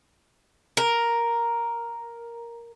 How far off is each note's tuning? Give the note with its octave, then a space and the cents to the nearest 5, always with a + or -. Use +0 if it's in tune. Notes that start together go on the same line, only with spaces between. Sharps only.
A#4 +5